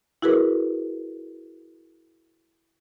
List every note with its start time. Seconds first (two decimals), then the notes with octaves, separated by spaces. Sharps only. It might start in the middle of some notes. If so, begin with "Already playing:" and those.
0.22 E4 F#4 G#4 A#4 B4